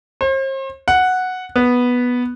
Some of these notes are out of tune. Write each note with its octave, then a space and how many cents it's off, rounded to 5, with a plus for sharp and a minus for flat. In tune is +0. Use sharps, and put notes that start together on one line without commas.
C5 +40
F#5 -5
B3 -5